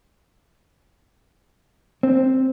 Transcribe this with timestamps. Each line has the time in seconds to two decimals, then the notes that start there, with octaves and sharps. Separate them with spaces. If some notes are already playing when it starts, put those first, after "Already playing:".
2.03 C4